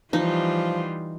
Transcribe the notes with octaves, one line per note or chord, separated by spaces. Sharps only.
E3 F3 G3 D#4 F4